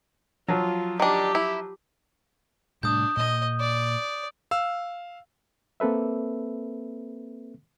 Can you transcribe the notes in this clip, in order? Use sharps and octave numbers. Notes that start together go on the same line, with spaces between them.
F3 F#3 F4
D#3 D4 G4
E4
A2 C3 G3 D4 D#6 G6
A#2 A#3 D#5
D5
F5 E6
A#3 C4 A4 B4 E5